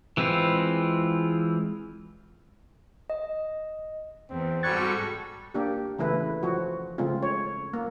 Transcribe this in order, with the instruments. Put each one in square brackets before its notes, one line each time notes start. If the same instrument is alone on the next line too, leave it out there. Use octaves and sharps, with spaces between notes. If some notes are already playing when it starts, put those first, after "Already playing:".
[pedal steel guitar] E3 G#3 C4 E4 F4
[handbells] D#5
[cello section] E2 [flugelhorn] C4
[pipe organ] G#2 G3 C#6 [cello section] F#4 A4 [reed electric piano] F#6 G#6 A6
[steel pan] A#3 D4 G4
C#3 E3 A3 E4 B4
F3 F#4
C#3 G#3 A3 C4 F4
C#5
A#3